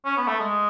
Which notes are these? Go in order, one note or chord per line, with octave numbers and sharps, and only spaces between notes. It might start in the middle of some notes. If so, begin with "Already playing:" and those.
C#4
B3
A3
G#3